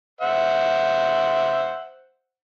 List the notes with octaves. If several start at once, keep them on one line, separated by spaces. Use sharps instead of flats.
C5 E5 F#5